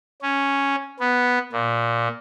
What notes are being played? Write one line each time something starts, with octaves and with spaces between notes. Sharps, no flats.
C#4
B3
A#2